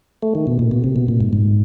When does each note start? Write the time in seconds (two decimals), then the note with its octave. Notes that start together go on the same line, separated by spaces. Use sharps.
0.23 A3
0.35 D#3
0.47 B2
0.59 A#2
0.71 B2
0.84 C3
0.96 B2
1.08 A#2
1.21 G#2
1.33 G#2